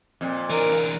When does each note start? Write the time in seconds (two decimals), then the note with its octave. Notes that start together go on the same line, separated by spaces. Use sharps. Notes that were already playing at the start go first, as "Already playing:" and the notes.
0.21 F2 A#2
0.50 E3 D4 A#4